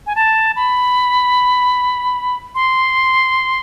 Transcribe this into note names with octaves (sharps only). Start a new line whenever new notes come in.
G#5
A5
B5
C6